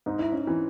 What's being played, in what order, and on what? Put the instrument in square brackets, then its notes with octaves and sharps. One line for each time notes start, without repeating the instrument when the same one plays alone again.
[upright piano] G#2 [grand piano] D#4
[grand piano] E4
C#4 D#4
[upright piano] E3